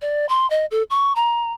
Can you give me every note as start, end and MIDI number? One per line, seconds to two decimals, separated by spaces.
0.01 0.28 74
0.29 0.48 84
0.50 0.65 75
0.71 0.83 69
0.90 1.13 85
1.16 1.53 82